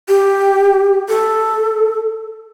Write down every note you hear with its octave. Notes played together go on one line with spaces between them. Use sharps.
G4
A4